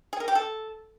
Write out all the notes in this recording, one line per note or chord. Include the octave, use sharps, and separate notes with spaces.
G#4
A#4
G4
A4